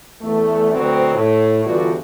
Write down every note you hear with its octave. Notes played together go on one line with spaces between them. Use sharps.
E2 A3
D2 B2 F#3 B3 C4
A2
G1 E2 G2 D4 F4 F#4